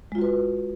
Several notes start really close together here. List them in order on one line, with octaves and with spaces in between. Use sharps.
G#3 F4 F#4 B4